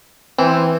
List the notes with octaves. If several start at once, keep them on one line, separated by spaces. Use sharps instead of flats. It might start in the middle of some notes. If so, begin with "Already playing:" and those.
E3 C4